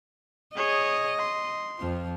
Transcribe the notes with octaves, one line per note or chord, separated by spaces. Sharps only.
G#4 C#5 D#5
C6
F2 F3